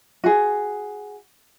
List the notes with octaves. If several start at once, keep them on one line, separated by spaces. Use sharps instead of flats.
F#4 G#4